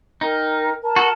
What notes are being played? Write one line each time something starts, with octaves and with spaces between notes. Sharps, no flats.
D#4 A#4 G5
A#4 A5
F#4 A4